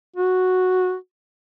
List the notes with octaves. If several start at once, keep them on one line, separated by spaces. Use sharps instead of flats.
F#4